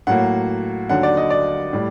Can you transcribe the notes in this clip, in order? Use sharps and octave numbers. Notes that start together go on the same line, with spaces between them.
A2 F#3 A#3 F#5
D#2 D3 F#3 F#5
D5
D#5
D5
A2 G3